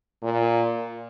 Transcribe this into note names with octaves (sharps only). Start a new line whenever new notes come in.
A#2